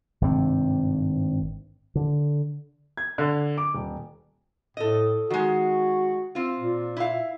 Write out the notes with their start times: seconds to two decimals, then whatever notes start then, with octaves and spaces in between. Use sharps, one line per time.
0.21 G#1 G2 C3 C4
1.95 D3
2.97 G#6
3.18 D3
3.58 D6
3.74 D#1
4.77 A2 A4 D#5
5.30 D#3 G#3 F#4
6.35 C4 F4
6.59 A#2
6.97 E4 F5